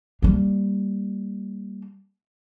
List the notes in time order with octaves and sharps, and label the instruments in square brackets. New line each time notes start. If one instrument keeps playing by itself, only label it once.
[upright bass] G3 A#3